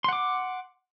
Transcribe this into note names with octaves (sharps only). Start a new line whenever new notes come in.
F#5 C6 D6